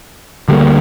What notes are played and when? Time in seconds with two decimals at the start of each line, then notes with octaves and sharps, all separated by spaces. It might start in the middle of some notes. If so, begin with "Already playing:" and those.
0.48 D2 D3 G3 A#3